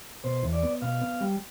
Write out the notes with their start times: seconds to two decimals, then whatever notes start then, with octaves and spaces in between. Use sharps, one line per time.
0.24 B2 C5
0.43 E2
0.53 D5
0.63 B3
0.82 B2 F5
1.01 B3
1.21 G3